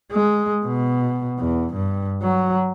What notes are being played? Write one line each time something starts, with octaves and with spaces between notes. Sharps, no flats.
G#3
B2
E2
G2
F#3